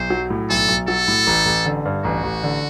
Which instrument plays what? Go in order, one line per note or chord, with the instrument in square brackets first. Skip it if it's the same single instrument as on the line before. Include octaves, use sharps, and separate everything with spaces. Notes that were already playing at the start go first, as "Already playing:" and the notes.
Already playing: [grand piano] B1 [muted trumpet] C5
[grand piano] F#3
A2
[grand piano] B1 [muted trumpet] A4
[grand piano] B1
[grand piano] F#3 [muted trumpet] A4
[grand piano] A2
A1
A1
D3
G2
[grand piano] A1 [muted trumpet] F#4
[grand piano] A1
D3